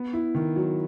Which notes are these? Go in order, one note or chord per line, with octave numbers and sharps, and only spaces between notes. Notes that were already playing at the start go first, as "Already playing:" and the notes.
Already playing: B3
E4
D#3
F#3